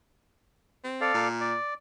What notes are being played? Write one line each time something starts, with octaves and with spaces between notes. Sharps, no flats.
C4
A4 D5 F5
A#2
D5